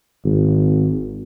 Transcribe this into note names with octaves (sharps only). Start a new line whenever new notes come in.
G#1